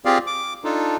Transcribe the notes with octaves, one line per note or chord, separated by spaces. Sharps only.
C4 F4 G4 G#4 D5 F5
D6
D4 D#4 F4 A4